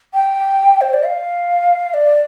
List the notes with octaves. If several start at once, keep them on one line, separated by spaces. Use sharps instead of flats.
G5
C5
D5
F5
D5